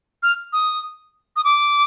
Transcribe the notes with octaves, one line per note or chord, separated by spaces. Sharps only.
F6
D#6
D#6
D6